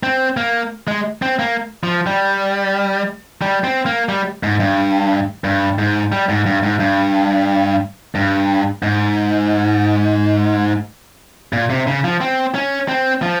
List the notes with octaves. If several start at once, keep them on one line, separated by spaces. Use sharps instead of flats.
C4
A#3
G#3
C4
A#3
F3
G3
G3
C4
A#3
G3
G#2
G2
G2
G#2
G3
G#2
G2
G#2
G2
G2
G#2
A#2
C3
C#3
F3
C4
C#4
C4
F3